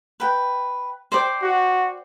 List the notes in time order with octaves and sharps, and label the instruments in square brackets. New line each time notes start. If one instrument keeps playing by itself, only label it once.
[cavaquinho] B4 G5
C5 D5 G5
[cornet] F#4